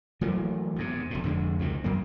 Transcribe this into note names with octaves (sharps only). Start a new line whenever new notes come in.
E3 F#3 A3 A#3
E2 G#2 C3
F1 A2
F2 D3 D#3 G#3
C#2 C3 D#3
F#2 F#3 A#3